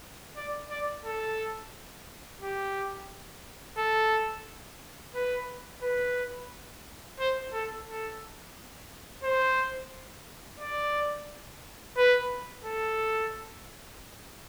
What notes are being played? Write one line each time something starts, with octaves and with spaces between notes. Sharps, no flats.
D5
D5
A4
G4
A4
B4
B4
C5
A4
A4
C5
D5
B4
A4